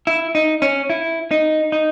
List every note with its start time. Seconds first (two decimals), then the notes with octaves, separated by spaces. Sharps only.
0.07 E4
0.35 D#4
0.62 C#4
0.90 E4
1.31 D#4
1.72 D#4